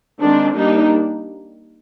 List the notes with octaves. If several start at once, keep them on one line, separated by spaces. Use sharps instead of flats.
D#3 G#3 C4 D4
G3 A#3 D4 D#4